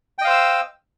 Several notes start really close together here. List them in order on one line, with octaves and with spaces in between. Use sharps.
G5 D#5 F5 C5 E6